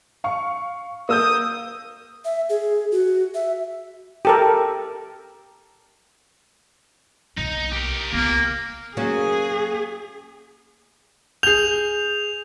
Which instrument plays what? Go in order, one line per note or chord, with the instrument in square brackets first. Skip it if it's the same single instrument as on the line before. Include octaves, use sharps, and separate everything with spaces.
[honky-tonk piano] F5 C#6
[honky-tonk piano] A#3 E6 G6 [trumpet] D#6
[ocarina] E5
G#4
F#4
E5
[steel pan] G4 A4 A#4
[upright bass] B1 A#3 [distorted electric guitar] D#4
[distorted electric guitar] G4 A#4
[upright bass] C#2 B3 [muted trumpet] A#3
[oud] F#3 A#3 C#4 [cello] G#4
[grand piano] G#4 G6 [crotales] F7